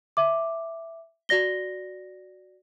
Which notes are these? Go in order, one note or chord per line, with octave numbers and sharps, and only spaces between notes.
E5 D6
F#4 D5 A#6 G7